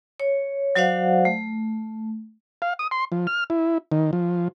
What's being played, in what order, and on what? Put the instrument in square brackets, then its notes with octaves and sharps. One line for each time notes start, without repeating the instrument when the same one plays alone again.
[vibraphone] C#5
F#3 F#4 C5 D5 F5 F#5
A3
[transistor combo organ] F5
D#6
C6
F3
F6
E4
D#3
F3